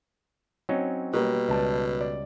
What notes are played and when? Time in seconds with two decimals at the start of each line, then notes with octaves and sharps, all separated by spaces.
0.69 F#3 C4 C#4 D#4
1.14 B2 G3 A#3 A#4
1.49 C#2 G3 B4 A5
2.01 D5